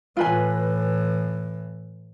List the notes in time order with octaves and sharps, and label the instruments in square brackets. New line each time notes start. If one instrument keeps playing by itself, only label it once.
[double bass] A2 E3 [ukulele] F4 B4 G#5